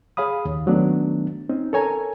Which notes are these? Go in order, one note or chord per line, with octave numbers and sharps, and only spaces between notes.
G#4 C#5 F5 B5 D#6
D#2
D#3 F#3 A3 B3 D4
C4 C#4 D#4
A4 A#4 C#5 G#5 A#5